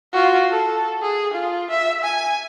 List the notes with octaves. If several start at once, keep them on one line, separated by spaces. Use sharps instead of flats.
F4 F#4
A4
G#4
F4
E5
G#5